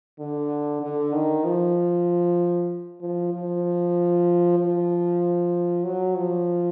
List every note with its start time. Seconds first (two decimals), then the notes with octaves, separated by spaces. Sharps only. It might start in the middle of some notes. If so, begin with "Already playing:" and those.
0.19 D3
0.82 D3
1.13 D#3
1.44 F3
3.01 F3
3.33 F3
4.58 F3
5.84 F#3
6.15 F3